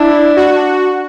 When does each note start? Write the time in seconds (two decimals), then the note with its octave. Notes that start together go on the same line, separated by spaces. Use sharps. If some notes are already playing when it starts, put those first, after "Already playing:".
Already playing: D4 E4
0.36 F#4